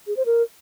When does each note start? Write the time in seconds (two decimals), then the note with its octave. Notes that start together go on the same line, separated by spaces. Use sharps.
0.07 G#4
0.17 C5
0.26 A#4